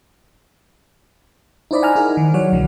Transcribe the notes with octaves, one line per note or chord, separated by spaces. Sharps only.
D#4 E4 C5 D5 D#5 B5
F#5 G#5 A#5 F6
D#4 E4 G#4 A#4
D#3
F#3 C#5 D5 F#5
B1 D3 E3 F#3